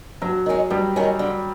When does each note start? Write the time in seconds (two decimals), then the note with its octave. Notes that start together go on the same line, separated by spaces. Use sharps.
0.22 G2 F#3
0.46 D#3 G#3 C#4
0.70 G2 G3
0.96 D#3 G#3 C#4
1.19 D3